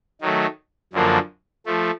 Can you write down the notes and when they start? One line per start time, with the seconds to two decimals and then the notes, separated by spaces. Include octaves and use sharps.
0.21 D#3 F#3 A3
0.93 F#2 D3 F3 A#3 D4
1.66 F3 A3